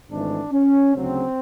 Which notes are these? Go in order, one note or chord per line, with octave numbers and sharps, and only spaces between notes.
G#1 G#2 E3 A3 D4
C#4
D2 C#3 F#3 C4